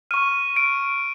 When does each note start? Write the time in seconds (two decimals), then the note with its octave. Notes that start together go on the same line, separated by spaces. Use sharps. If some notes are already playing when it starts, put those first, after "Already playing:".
0.11 C#6 F6 D#7
0.56 D7